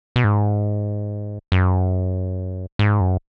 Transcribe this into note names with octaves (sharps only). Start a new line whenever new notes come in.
B2
G#2
F#2
G#2
F#2